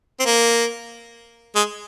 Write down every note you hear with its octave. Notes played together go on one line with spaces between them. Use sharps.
C4
A#3
G#3